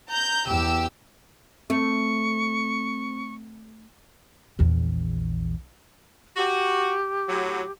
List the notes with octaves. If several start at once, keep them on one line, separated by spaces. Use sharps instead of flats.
A#5 G6
E2 G4 E6
A3 C4 C#6
A#1 E2
F#4 G4
A2 F#3